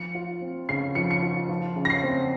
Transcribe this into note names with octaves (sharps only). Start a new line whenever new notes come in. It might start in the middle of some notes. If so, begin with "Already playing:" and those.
Already playing: F3 C#7
F4
C4
C#3 C7
F3 C#7
C#7
F4
F3
C#3
A#6
C7
C4